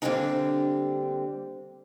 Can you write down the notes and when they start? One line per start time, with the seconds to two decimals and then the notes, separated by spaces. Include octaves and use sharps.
0.02 D3 G3 A#3 C4 D4 D#4